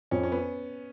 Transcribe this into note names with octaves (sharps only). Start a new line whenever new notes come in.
F2 C#4
C#4
B3